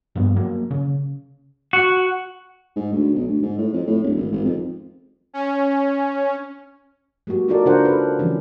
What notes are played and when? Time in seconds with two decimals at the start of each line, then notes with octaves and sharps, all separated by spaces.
0.15 G2 F3 A#3 B3
0.36 F#3 A#3
0.71 C#3
1.73 F#4
2.76 G#2
2.93 D2
3.15 B1
3.28 D2
3.42 G#2
3.58 A2
3.73 F2
3.87 A2
4.03 D1
4.17 G#1
4.32 G#1
4.45 F2
5.33 C#4
7.27 F#3 G#3 A#3 F#4 G4
7.48 D#4 F4 F#4 A4 A#4 D5
7.65 C#3 D4 F4 A#4 C5 F#5
7.85 A4 B4
8.19 C#3 E3 F3 G#3 C4 C#4